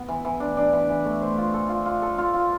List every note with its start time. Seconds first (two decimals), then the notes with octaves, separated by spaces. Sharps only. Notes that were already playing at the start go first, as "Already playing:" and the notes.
Already playing: B3
0.08 E3
0.25 E3
0.40 D4
0.57 D4
0.73 E3
0.89 E3
1.05 A3
1.21 C5
1.38 F4
1.54 A4
1.69 F4
1.86 F4
2.02 A4
2.18 F4
2.34 F4